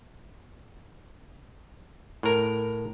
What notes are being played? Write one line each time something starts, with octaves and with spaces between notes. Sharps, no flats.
A2 A#4